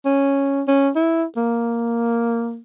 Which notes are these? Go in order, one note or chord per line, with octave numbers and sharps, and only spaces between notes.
C#4
C#4
E4
A#3